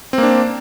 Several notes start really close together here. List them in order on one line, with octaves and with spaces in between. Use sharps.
C4 A#3 D4